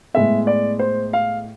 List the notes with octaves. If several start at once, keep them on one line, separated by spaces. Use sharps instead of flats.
A2 G#3 B3 E5
D5
C5
F5